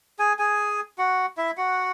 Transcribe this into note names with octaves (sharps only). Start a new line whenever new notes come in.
G#4 G#5
G#4 G#5
F#4 F#5
E4 E5
F#4 F#5